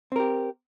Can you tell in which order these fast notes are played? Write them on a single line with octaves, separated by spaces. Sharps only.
C4 A#4 G4